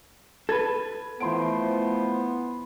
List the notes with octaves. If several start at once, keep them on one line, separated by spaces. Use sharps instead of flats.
A4 B4 G#6
E3 F3 A3 B3 C5 C6 D7